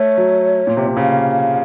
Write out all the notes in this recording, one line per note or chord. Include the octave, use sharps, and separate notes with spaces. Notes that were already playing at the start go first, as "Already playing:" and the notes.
Already playing: A3 C#5
F#3
A#2
C3
C3
C#3 F5